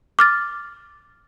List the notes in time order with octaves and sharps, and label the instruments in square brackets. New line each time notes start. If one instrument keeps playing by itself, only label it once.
[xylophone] D6 F6 A6